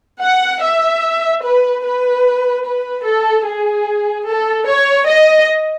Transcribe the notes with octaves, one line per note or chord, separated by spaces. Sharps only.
F#5
E5
B4
B4
B4
A4
G#4
A4
C#5
D#5